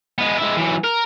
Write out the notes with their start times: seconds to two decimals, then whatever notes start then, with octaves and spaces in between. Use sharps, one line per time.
0.18 G#3 B3
0.38 G#3 E4
0.57 E3 F#3
0.84 A#4